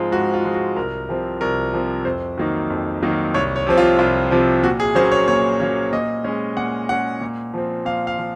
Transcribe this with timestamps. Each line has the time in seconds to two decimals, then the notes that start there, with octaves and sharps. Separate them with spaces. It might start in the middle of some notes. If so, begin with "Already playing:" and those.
Already playing: G#2 F3 G#3 C4 F4
0.12 G#2 F#4
0.34 F4
0.45 F3 G#3 C4
0.55 F#4
0.76 C2 A#4
1.09 C3 F3 C4
1.41 C2 A#4
1.74 C3 F3 C4
2.05 F2 C5
2.38 D#3 F#3 A#3 D#4
2.70 F2
3.03 D#3 F#3 A#3 D#4
3.34 C2 C#5
3.56 C#5
3.67 C3 F3 C4
3.77 F4
3.99 C2 F4
4.31 C3 F3 C4
4.63 A#2 F#4
4.80 G#4
4.95 F#3 A#3 C#4 C5
5.12 C#5
5.28 A#2 C#5
5.60 F#3 A#3 C#4
5.93 A#2 D#5
6.24 G#3 C#4
6.57 A#2 F#5
6.89 G#3 C#4 F#5
7.21 A#2
7.54 F3 C4
7.85 A#2 F5
8.07 F5
8.19 F3